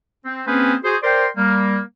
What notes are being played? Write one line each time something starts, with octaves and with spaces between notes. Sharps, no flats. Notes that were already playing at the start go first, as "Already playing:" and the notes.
C4
A#3 C4 C#4 G#4 B4 C5
F#4 G#4 C5
A#4 C5 D5 G5 C6
G3 A#3